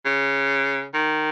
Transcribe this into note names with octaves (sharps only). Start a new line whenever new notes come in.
C#3
D#3